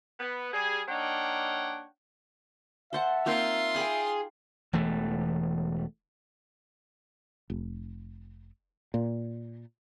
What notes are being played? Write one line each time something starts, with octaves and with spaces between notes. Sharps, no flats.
B3
G3 G#4
A#3 D4 D#4 C#5 F#5 G5
A4 C5 E5 F#5
A#3 C4 D#4 F4 C6
G#4 G5 B5
E1 E3 A3
F1
A#2